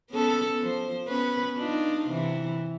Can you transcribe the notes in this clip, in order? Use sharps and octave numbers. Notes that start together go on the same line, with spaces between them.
B3 C#4 A4
F3 C5
B3 C#4 B4
D4 D#4 F4
C3 E3